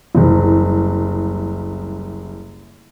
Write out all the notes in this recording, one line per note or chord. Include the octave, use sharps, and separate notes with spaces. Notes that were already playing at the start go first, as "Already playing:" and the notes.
F#1 C2